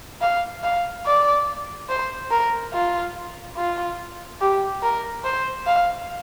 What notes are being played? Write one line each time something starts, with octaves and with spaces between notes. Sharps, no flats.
F5
F5
D5
C5
A#4
F4
F4
G4
A#4
C5
F5